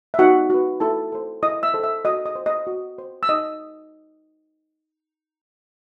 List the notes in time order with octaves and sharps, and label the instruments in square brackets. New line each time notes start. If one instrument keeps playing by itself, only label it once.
[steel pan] E5
D#4 F#4 F#5
F#4 B4
E4 A4 A5
A4 C5
E4 D#5 D#6
E5 E6
A4 C5
E5 E6
F#4 D#5 D#6
D#5 D#6
C5
D#5 D#6
F#4
C5
E6
D#4 D#5 D#6